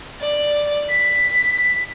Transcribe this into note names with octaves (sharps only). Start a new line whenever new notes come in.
D5
B6